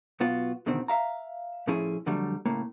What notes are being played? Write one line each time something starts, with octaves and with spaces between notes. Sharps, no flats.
B1 B3 F4 F#4
E2 B2 D3 D#3 C4
E5 F5 A#5
A2 F3 C#4 E4 G#4
F2 D3 F#3 G3 A3
A2 C#3 A#3